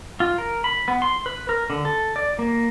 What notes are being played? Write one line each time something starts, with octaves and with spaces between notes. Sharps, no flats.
F4
A#4
B5
B3
C6
B4
A#4
D3
A4
D5
A#3